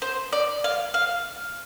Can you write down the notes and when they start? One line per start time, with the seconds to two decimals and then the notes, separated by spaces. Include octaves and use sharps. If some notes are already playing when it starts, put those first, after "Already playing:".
0.02 C5
0.33 D5
0.64 F5
0.94 F5